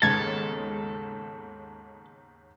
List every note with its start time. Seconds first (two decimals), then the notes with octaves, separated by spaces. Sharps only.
0.02 D#2 G#2 C#3 G#3 B3 A4 G#6 A6